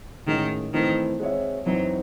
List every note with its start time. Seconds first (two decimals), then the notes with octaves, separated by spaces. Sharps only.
0.27 A2 D#3 G#3 C#4 F#4
0.74 D#3 E3 A3 C4 E4
1.20 G#3 C4 F#4 C#5 E5
1.66 F#2 E3 F#3 C4 D#4